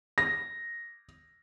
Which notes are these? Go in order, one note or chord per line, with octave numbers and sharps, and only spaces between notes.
A#6